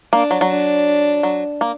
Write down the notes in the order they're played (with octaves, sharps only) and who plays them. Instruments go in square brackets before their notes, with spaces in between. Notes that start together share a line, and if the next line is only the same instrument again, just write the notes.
[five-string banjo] A#3 [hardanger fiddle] D4
[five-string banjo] F#3
F#3
[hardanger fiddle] D4
[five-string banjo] F#3
A#3